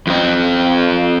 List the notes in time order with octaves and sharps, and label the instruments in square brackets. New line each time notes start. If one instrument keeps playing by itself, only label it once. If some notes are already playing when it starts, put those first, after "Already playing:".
[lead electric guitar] F2 C4